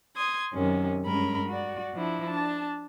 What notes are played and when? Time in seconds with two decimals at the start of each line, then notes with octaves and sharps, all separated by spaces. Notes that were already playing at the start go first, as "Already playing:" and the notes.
0.15 C6 D#6 G#6
0.53 F#2 C3 D#3 C#4
1.06 G2 G#3 C#4 A#4 B5
1.49 F#4 D5
1.93 F3 D4 E4
2.26 D4 A5